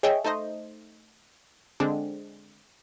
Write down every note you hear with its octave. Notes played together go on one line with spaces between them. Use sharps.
G#4 C#5 D#5 E5 G5 C#6
A3 D#4 C5 D#5
D3 G#3 C4 D4